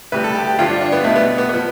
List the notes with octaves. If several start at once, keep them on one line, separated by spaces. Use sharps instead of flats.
D2 C3 G3 B4
A4
G4
G4
G2 D3 F3 F4
D4
D4
B3
B1 B2 G3 A3
B3
B3
F3 B3